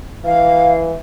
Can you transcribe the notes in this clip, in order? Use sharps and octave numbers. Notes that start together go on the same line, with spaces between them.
E3 F5